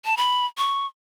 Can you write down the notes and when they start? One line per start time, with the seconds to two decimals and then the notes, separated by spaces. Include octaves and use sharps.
0.05 A5
0.17 B5
0.58 C#6